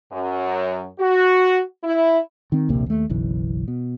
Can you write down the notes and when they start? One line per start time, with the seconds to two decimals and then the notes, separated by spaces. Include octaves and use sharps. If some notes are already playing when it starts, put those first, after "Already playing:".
0.11 F#2
0.99 F#4
1.83 E4
2.52 D#3 C4
2.69 A#1 D#2 C3 A#3
2.86 D#2 A3
3.09 F#1 B1 E3
3.68 B2